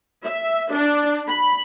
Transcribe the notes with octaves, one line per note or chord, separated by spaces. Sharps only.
E5
D4
B5